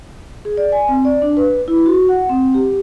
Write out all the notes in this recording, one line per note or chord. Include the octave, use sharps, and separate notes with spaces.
G#4
D5
G#5
C4
D5
D4
B4
E4
F#4
F#5
C4
G4